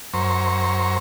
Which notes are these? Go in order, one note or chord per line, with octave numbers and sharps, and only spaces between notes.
F#2 C5 A#5 C#6